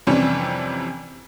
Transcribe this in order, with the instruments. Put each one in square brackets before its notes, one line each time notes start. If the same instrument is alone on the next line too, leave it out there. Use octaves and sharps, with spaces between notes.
[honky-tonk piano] F2 C3 E3 G3 C#4 D4